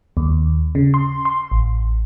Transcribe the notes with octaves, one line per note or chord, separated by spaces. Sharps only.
D#2
C#3
C6
C6
A1